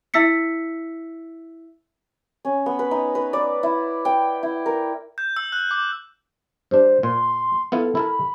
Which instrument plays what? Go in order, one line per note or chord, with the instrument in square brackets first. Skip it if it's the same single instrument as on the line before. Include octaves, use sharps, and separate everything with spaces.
[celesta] E4 E5 E6 B6 C#7
[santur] C#4
B3
B4
D#4
B4
D5
E4
G5
E4
A#4
[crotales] G6
E6
F#6
D6
[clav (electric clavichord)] G2 D4 [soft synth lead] C5
[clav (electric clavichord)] A#2 [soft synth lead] C6
[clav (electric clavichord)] B3 E4 F4 [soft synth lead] A4
[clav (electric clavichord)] E4 A4 A#4 [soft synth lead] B5